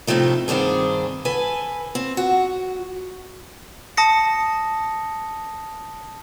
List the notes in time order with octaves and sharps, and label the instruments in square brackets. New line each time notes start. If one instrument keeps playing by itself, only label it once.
[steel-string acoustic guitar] A2 C3 F3 A3 D#4
G2 D#3 C4 D4 G#4
A4 B4 G#5
C4
F#4
[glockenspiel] A5 D#6 A#6 C#7